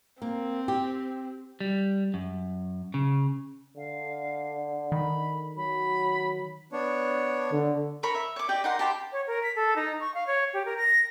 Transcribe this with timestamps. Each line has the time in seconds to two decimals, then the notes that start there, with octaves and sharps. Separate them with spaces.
0.22 A#3 C4
0.68 G4
1.60 G3
2.14 F#2
2.94 C#3
3.77 D3 F5
4.92 D#3 B5
5.57 F#3 B5
6.72 B3 D4 C#5
7.52 D3
8.03 A#4 C#5 B5
8.15 E5
8.36 C#5 D6
8.49 G4 D5 D#5 G5
8.64 D#4 A#4 F#5 C6
8.79 G4 A5 B5 C6
9.12 C#5
9.27 A#4
9.43 B6
9.55 A4
9.76 D#4
10.00 C#6
10.14 F5
10.27 C#5
10.53 G4
10.65 A#4
10.77 A#6